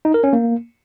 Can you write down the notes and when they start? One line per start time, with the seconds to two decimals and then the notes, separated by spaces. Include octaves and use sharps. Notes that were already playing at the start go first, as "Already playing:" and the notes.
0.05 D#4
0.14 A#4
0.24 C#4
0.33 A#3